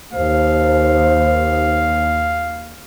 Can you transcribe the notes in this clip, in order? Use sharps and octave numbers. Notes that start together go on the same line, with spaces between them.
D#2 C5 F5